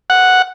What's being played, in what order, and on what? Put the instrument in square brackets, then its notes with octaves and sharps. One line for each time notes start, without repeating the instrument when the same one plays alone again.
[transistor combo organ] F#5